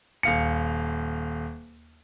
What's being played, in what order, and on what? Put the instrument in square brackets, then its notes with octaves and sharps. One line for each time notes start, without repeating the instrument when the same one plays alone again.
[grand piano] D#1 F5 C#7